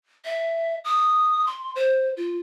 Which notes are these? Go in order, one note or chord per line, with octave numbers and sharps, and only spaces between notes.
E5
D#6
C6
C5
F4